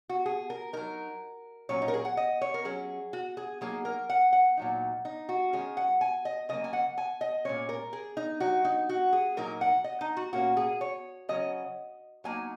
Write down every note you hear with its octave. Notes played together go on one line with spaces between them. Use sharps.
F#4
G#4
A#4
F#3 D#4 A#4
A#2 F#3 C#4 C#5
D#4
A#4
G#4
F#5
D#5
C#5
A#4
F#3 C#4 G#4
F#4
G#4
F#3 A#3 D#4 G#4
A#4
F#5
F#5
A#2 F#3 D#4
D#4
F#4
D#3 G#3 C#4 G#4
F#5
G#5
D#5
C#3 F#3 A#3 D#5
G#5
F#5
G#5
D#5
A#2 G#3 C#4 C#5
A#4
G#4
D#4
F#3 D#4 F#4
D#4
F#4
G#4
A#2 F#3 A#3 D#4 A#4
F#5
D#5
D#4
F#4
A#2 A#3 C#4 F#4
G#4
C#5
C#3 F#3 C#4 D#5
F#3 A#3 D#4 G#5